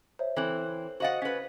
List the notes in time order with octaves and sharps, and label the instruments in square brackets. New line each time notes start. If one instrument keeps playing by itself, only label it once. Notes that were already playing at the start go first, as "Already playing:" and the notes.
[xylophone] C5 C#5 E5
[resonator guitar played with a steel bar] E3 C4 [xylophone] A4 F#6 F#7
[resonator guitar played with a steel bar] F#4 D#5 F#5 [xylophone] C5 F5 A6
[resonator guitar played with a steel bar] C#4 B4 [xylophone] B6